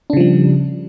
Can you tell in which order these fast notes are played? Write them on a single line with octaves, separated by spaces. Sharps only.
D4 C#3 F3 G3